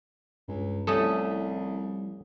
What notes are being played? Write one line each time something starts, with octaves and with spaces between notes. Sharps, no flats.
C#2 G2
C2 F3 G3 A3 C#4 E4 A4 D#6